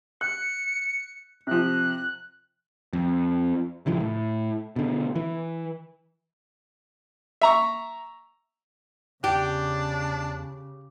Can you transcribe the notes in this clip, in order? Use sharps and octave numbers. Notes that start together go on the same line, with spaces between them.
F#6 C#7
C3 F3 F#6
F2
A#1 C#3 E3 F3
A2
B2 D3
E3
E5 A#5 C#6
E2 C#3 D4 G4